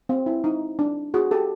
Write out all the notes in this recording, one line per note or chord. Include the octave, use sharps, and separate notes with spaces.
C4
E4
D#4
D4
F#4 G#4
G4 A4